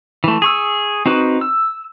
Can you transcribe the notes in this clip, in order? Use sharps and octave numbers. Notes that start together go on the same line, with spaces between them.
E3 A3
G#4 C#6 E6
C4 D#4 F#4 B4
E6